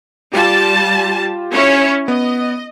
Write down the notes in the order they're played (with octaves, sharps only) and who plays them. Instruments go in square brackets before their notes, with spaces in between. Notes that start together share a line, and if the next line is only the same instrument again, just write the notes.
[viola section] G3 A5 [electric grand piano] F4 G4
[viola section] C#4 E4 C#5
[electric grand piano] B3 [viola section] D#5